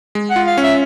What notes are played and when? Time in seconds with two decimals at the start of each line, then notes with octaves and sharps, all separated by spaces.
0.15 G#3
0.30 F#5
0.36 F4
0.47 F5
0.58 C#4
0.63 E5